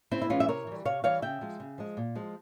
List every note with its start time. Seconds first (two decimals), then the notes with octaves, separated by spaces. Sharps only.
0.11 C#3 C4 E4
0.22 E4
0.30 E3 G#3 C#4 F4
0.40 E5
0.48 C3 A#4 C#5
0.67 E3 G3
0.85 C3 C#5 F5
1.04 E3 G3 C#5 F5
1.22 C#3 E5 G5
1.41 F3 G#3
1.60 C#3
1.78 F3 G#3
1.97 A#2
2.15 F3 G#3